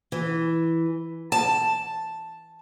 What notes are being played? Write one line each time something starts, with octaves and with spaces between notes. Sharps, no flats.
E3
A5